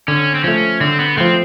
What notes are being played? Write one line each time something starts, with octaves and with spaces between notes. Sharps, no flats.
D3 C#4
C4
F3 A3 C#4
D3 C4
B3
F3 A3 C4